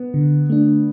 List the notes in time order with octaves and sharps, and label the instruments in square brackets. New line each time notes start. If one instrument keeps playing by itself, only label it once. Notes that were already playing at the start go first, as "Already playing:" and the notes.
Already playing: [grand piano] B3
[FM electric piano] D3
A3 D4